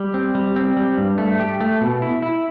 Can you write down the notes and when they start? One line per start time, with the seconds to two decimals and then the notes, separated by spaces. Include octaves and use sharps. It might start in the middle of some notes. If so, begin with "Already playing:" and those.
Already playing: G3
0.14 C4
0.35 G3
0.56 C4
0.77 G3
0.98 G2
1.18 A3
1.40 G4
1.61 A3
1.81 B2
2.02 E4
2.22 E4